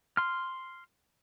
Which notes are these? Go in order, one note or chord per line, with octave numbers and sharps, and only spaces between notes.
C6 F6